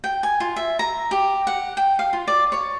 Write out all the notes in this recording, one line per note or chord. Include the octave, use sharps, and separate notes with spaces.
G5
G#5
F4
E5
A#5
G4
F#5
G5
F5
F4
D5
C#5